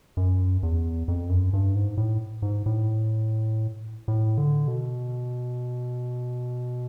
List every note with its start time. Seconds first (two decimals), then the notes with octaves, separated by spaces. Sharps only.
0.17 F#2
0.63 E2
1.08 F2
1.30 F#2
1.53 G2
1.75 G#2
1.97 A2
2.42 G#2
2.66 A2
4.08 A2
4.38 D3
4.68 B2